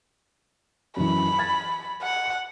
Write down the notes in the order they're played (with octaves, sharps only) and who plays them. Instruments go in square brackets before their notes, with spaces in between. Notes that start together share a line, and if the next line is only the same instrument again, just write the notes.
[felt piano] F#2 E3 [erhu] B5
[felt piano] G#6 A6
[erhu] F#5